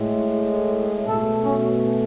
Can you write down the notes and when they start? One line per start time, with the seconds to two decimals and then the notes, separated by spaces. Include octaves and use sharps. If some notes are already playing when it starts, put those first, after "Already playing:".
Already playing: A2 G#3
1.07 B2 A3 A4
1.42 C#4